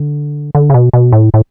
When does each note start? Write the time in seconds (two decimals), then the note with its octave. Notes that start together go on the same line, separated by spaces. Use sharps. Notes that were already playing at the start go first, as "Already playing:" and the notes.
Already playing: D3
0.55 D3
0.70 C#3
0.74 B2
0.93 B2
1.12 A2
1.34 A2